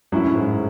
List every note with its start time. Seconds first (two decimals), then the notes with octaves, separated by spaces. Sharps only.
0.12 F#2 A2 F#3 C#4 E4
0.35 G#2